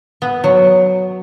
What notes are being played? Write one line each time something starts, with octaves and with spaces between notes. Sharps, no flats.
B3
F#3